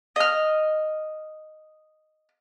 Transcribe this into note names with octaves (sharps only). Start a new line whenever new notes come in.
D#5 F6